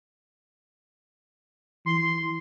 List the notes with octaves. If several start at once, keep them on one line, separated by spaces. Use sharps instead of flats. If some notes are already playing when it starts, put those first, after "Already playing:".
E3 C6